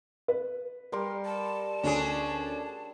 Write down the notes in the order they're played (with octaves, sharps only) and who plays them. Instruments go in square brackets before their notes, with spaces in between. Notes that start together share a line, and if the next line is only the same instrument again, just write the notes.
[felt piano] B4
[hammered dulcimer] G3 A#4 C6
[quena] A5
[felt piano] D2 [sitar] C#4 D4 G#4